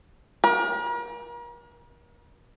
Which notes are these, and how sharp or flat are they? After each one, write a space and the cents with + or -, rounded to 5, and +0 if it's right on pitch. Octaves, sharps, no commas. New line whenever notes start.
A#4 +40